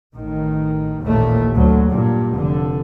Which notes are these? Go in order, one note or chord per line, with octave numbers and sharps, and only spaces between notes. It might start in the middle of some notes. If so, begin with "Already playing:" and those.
A1 D#3
A1 D#2 A#2 A3
D2 F#3
G2 A#2
F1 D3